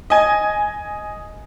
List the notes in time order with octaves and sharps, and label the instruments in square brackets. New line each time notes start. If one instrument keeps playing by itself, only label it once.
[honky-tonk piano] D#5 G#5